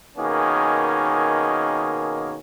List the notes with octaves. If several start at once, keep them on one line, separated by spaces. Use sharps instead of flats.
B2 D#3 A#3 C#4 G#4